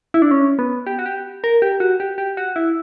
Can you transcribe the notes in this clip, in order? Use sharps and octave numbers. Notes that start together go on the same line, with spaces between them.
E4
D4
C#4
B3
G4
F#4
G4
A#4
G4
F#4
G4
G4
F#4
E4